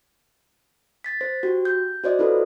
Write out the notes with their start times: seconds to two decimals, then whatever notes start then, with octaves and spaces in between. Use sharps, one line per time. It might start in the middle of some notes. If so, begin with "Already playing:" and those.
1.04 A6 B6
1.21 C5
1.43 F#4 G4
1.65 G6
2.04 F#4 C5 D5 D#5
2.19 E4 F4 A4 B4